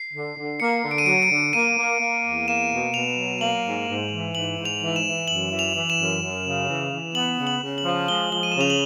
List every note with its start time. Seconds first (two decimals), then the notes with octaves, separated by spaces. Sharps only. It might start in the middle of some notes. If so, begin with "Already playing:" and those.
Already playing: C7
0.14 D3
0.36 D3
0.60 A#3 C#7
0.84 D3
0.91 D7
0.98 D#7
1.06 F#3 D7
1.23 D7
1.30 D3
1.53 A#3 D#7
1.77 A#3
2.00 A#3
2.24 E2
2.48 A#3 E7
2.71 B2
2.94 B2 F7
3.18 F#3
3.40 A#3 F#7
3.65 G#2
3.87 G#2
4.11 E3
4.34 G#2 F#7
4.58 G#2
4.65 F7
4.81 E3
4.96 E7
5.05 E3
5.28 F#2 F#7
5.51 E3
5.59 F7
5.75 E3
5.90 E7
5.98 F#2
6.21 F#2
6.45 C#3
6.68 E3
6.92 E3
7.15 B3 F#7
7.38 C#3
7.47 F#7
7.62 C#3
7.78 F#7
7.85 F3
8.08 G#3 G7
8.32 F3 G7
8.43 D#7
8.52 C#3 E7
8.61 F7
8.70 F#7